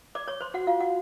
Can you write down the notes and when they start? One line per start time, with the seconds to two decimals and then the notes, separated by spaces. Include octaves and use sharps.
0.15 D5 D6
0.28 C#5 C#6
0.41 C5 C6
0.54 F#4 F#5
0.67 F4 F5
0.80 F#4 F#5